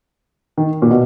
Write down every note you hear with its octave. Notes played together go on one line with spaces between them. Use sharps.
D#3
A#2
B2